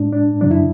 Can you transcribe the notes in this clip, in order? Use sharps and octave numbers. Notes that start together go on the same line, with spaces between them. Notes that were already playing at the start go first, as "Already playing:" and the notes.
Already playing: A2 G#3 D4
D4
F#2 C#3 F#3 D4
E4